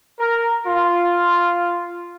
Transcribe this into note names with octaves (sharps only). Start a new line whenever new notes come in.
A#4
F4